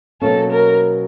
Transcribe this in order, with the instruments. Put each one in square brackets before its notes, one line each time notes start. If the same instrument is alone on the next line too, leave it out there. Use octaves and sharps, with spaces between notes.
[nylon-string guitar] B2 F#3 A#3 C#4 [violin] A4
[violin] A#4